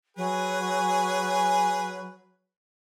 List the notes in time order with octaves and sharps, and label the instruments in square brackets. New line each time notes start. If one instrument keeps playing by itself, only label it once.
[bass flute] F#3 [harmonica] G#4 B4 G#5